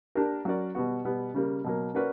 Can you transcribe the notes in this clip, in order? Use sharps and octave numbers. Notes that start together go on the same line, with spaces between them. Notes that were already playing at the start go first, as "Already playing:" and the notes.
A#3 D4 G4 A#4
F#3 C#4 F#4 A#4 D5
B2 G3 B3 F#4
B2 G3 B3
C#3 G3 A#3
B2 F#3 A#3
A#3 C#4 F#4 B4 D5